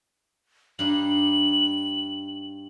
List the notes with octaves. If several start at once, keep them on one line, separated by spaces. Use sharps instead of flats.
G2 D4 D#4 F#7